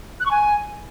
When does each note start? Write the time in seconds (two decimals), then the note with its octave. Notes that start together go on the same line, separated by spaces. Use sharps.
0.20 F#6
0.26 C#6
0.31 G#5